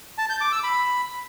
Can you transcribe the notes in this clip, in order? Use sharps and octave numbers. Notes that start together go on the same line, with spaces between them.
A5
G6
D6
E6
B5